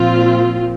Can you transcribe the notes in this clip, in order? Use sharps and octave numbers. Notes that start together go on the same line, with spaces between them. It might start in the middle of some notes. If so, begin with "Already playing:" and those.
Already playing: A#2 F3 C4 F4